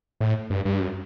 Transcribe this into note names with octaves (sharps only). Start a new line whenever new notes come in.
A2
G2
G2
F#2